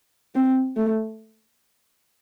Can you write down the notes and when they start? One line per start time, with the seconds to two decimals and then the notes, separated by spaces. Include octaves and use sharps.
0.35 C4
0.76 A3